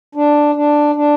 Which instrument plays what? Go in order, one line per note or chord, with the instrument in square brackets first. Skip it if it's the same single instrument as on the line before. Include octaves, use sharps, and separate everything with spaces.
[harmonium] D4
D4
D4